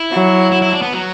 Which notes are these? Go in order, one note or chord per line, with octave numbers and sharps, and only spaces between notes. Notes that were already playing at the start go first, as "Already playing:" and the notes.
Already playing: E4
F#3
E4
E4
D4
B3
F#3